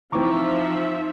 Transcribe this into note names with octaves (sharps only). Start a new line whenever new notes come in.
E3 F3 C4 D#4 E5 A#5 C#6 D6